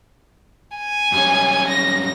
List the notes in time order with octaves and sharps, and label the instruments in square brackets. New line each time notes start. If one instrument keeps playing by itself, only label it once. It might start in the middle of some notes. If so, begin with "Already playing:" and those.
[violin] G#5
[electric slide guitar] F#2 G3 C#4
[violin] A#6